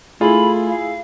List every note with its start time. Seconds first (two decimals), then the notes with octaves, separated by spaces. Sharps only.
0.21 A3 E4 F4 G#4 B5
0.68 F5